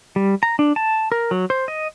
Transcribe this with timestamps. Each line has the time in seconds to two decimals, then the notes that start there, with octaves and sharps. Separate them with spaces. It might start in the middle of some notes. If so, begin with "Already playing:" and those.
0.16 G3
0.43 A#5
0.59 D4
0.76 A5
1.12 A#4
1.31 F#3
1.50 C5
1.68 D#5